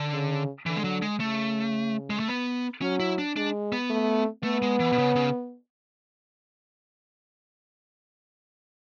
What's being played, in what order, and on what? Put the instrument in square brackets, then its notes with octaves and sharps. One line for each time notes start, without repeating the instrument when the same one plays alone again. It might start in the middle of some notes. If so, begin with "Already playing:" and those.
Already playing: [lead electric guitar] D3
[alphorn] C#3
[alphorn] D3 [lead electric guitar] E3
[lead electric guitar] G#3
F#3
G#3
[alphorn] C#3 [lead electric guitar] A3
[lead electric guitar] G#3
A3
B3
[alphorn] F#3 [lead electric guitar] C#4
[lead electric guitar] E4
D4
[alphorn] G#3 [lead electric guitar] D4
[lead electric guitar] B3
[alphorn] A3
[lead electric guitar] A3 [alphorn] B3
[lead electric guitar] G#3
E3
B2
C#3
C#3